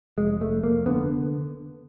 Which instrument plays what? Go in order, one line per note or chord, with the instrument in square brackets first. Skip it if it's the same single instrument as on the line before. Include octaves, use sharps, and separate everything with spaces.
[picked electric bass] F1 G#3
F1 A3
F1 A#3
D3 B3